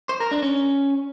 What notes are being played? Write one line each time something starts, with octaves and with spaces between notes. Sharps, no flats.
C5
A#4
D4
C#4